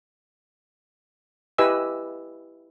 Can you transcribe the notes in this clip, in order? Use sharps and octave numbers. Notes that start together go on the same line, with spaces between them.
E4 G4 B4 D#5 G#5 E6